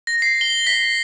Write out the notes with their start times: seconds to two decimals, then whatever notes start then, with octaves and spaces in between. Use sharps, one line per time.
0.07 A#6
0.22 C7
0.41 G7
0.67 B6